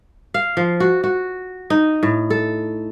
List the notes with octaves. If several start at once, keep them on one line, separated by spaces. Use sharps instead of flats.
F5
F3
F#4
F#4
D#4
A2
A4